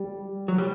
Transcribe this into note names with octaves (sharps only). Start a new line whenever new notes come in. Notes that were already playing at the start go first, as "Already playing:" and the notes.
Already playing: G3
F#3
G3